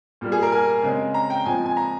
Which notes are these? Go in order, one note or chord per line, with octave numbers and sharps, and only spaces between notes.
A#2 G3 A#3
G#4
A#4
G#5
C#3 G#3 C4
A#5
G5
A#2 F3 G#3 C4 G#5
G#5
A#5